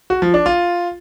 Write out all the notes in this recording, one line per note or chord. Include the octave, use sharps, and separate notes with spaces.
F#4
F3
D4
F4